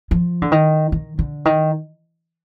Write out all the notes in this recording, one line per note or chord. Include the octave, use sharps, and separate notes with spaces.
F3
D3
D#3
D#3
D3
D#3